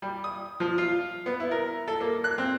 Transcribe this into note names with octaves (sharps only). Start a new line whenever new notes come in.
G3
D#6
F3
F4
B3
E4
A#4
A4
A#3
F#6
C4